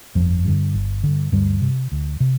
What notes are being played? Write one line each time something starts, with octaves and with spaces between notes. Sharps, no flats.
G1 F2 F3
G2 D3
G1
G2 D3
D2 G2 G3
C3
D2
C3